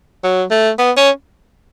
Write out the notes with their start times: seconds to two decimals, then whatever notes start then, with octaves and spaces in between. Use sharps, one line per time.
0.24 F#3
0.51 A3
0.79 B3
0.97 C#4